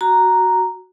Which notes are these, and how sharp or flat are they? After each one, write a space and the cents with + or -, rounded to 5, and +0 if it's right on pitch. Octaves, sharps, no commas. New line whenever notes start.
F#4 +0 A#5 +0